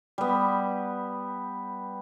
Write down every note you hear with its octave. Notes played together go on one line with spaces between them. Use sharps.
G3 B3